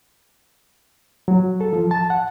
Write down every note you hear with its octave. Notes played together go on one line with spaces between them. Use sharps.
F#3
A4
F3
A5
F#5